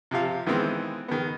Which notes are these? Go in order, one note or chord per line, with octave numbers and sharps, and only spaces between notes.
C3 F3 G4 F5
D#3 E3 G#3 B3 C4
D#3 B3